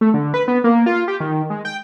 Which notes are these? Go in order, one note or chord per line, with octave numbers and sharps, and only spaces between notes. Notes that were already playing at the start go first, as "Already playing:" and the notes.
A3
D3
B4
B3
A#3
F4
G4
D#3
G#3
G5